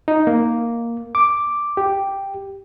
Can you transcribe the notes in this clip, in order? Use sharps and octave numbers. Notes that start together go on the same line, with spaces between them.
D#4
A#3
D6
G4